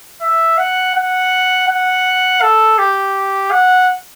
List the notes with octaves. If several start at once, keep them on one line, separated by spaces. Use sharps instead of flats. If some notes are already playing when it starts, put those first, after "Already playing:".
E5
F#5
F#5
F#5
A4
G4
F#5